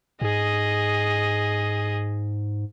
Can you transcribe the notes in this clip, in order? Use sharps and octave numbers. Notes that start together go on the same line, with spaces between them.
G#2 G#4 D#5